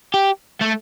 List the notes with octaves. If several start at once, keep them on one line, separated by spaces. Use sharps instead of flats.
G4
A3